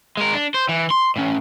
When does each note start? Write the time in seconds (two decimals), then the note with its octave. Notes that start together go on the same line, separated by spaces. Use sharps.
0.17 G#3 A#4
0.34 D4
0.54 C5
0.69 E3
0.91 C6
1.16 A2 C#4